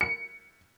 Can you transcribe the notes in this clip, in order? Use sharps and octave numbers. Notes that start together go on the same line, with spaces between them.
C#7